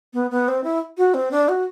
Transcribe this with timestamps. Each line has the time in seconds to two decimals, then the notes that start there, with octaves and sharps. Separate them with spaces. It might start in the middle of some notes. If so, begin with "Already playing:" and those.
0.13 B3
0.31 B3
0.48 C4
0.64 E4
0.97 F#4
1.14 C4
1.31 D4
1.48 F#4